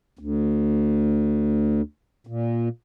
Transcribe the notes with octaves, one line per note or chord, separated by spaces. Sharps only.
D2
A#2